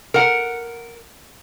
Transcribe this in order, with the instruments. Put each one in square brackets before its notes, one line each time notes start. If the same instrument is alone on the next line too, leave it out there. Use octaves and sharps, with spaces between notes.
[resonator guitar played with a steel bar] A#4 F#5